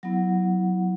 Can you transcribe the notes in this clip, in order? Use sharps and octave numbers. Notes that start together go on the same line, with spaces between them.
F#3 B3 E4 F#5